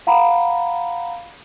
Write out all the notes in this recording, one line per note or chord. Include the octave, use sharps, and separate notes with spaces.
F5 F#5 A#5 B5